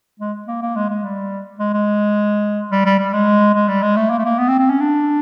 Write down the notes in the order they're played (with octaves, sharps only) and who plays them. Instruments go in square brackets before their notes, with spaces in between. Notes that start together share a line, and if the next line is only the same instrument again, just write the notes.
[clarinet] G#3
A#3
A#3
G#3
G#3
G3
G#3
G#3
G3
G3
G3
G#3
G#3
G3
G#3
A3
A#3
A3
A#3
B3
C4
C4
C#4
D4